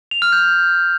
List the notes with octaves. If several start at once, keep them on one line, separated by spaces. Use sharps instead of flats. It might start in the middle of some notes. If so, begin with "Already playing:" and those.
F7
F6
G6